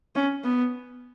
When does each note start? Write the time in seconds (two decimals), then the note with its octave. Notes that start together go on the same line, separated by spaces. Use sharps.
0.16 C#4
0.44 B3